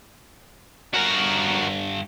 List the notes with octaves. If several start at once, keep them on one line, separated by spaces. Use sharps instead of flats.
G2 F#4 A#4 F#5